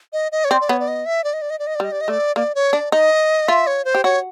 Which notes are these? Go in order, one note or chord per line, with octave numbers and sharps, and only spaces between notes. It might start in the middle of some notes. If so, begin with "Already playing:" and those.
D#5
D#5
C#5
C4 D5
D5
B3 C#5
D5
D#5
E5
D5
D#5
D5
D#5
D5
D#5
D5
G3
D#5
D5
D#5
A3 D5
A#3 D5
C#5
D4 D5
D#4 D#5
F4 E5
C#5
C5
G4
F#4 C#5